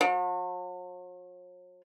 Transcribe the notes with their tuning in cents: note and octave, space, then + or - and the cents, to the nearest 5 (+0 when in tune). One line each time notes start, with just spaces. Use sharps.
F#3 -45